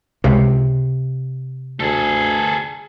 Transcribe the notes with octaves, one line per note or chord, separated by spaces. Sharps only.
C#2 C3
D2 G#4 A4